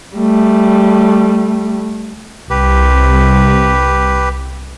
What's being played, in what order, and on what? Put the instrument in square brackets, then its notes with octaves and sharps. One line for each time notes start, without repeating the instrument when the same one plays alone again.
[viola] G3 A3
[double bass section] C2 [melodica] G4 B4